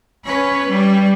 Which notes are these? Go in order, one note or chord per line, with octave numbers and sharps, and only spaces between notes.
C#4 B4
G3